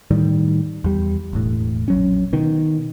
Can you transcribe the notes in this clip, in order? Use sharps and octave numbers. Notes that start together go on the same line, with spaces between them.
A2 D#3 G3
E2 G3
E1 A2
A#1 F#3 C#4
B2 D#3